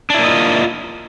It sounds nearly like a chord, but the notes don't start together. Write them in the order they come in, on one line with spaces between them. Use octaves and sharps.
D4 E4 A#3 D#5 F4